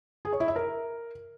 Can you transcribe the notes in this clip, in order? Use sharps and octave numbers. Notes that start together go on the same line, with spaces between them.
G#4
C#5
E4
E5
A#4